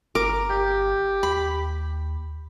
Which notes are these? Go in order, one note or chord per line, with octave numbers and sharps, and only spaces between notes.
G1 A#4 D6
G4
D#2 B5